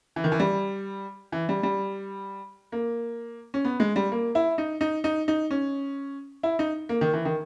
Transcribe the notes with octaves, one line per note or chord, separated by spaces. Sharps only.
E3
D#3
E3
G3
E3
G3
G3
A#3
C#4
B3
G#3
G3
A#3
E4
D#4
D#4
D#4
D#4
C#4
E4
D#4
A#3
D#3
E3
D#3